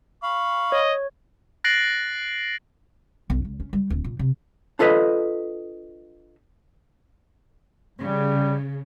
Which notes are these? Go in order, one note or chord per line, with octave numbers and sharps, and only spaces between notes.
F5 B5 C#6
C#5 D#5
F#6 A6 A#6 C7 D7 F#7
B1
C#2
C#4
G3
D1
A#2
C3
D4 F4 A4 B4 D#5
C#3 G3